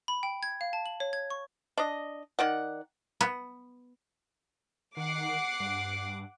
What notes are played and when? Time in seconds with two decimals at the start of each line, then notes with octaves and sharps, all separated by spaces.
0.08 B5
0.23 G5
0.43 G#6
0.61 F5
0.73 A5
0.86 F#7
1.00 C#5
1.13 G#6
1.30 C#6
1.78 D4 D#5
2.39 D#3 D5 F#5
3.21 B3
4.97 D#3 F#5 D6 C7
5.60 G2